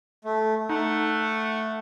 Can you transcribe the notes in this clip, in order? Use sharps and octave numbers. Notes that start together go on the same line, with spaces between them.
A3
A3 D#4 F#5